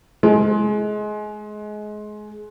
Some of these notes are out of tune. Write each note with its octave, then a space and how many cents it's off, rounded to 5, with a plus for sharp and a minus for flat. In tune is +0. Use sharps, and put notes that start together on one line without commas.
G#3 +25